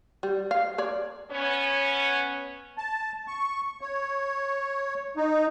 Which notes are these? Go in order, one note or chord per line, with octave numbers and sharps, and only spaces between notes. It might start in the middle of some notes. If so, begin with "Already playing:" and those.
G3
F5
C#5 D5
B3 C#4 C#5
A5
C#6
C#5
D#4